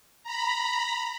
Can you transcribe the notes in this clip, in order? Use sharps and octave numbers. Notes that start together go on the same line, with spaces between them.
A#5 B5